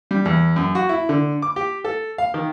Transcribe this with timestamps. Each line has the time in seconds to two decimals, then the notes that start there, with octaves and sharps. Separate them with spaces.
0.11 G3
0.25 E2
0.56 F#2
0.75 F#4
0.89 E4
1.09 D3
1.42 D6
1.56 G4
1.85 A4
2.18 F5
2.34 D#3